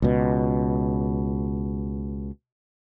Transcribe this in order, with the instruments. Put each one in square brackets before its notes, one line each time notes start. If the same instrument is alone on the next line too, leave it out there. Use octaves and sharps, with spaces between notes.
[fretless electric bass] C#2 B2